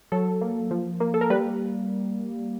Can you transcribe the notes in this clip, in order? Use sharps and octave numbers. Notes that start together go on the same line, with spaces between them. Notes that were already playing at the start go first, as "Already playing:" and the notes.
F#3 A4
A#3
F3
A#3
A4
A#4
G3 B4